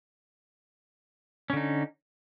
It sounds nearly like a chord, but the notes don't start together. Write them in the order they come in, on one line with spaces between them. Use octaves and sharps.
C#4 D3 D#4